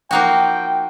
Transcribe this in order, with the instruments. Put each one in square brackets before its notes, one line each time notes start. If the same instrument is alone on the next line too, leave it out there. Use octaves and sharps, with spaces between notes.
[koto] F3 A#3 D#4 F#4 [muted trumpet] G5